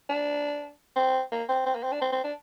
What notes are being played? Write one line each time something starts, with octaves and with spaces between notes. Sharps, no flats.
D4
C4
A#3
C4
C4
A#3
C4
D4
C4
C4
D4